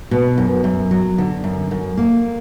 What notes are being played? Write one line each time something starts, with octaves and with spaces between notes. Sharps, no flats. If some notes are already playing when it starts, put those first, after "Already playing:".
B2
F#2
F#2
F#3
D3
F#2
F#2
A#3